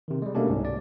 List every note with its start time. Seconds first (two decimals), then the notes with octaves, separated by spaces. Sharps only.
0.08 C3 D#3
0.22 G3 G#3
0.35 B2 A3 A#3 C#4 D4 G4
0.49 C2 G#2
0.65 D5